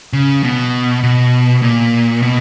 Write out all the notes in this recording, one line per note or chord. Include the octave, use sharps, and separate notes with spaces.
C#3
B2
B2
A#2
B2